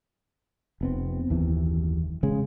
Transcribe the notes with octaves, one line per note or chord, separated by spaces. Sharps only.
F1 B3 C4
F#1 D#2 E3
C#3 G#3